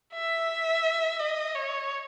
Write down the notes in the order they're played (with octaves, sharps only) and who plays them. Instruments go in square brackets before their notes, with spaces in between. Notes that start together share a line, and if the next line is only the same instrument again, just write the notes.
[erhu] E5
D#5
C#5